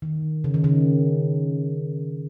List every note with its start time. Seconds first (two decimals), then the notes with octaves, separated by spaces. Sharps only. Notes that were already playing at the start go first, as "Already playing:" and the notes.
0.02 D#3
0.44 C#3
0.54 D#3
0.64 C#3